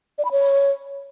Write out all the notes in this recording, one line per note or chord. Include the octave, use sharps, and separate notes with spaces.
D5
B5
C#5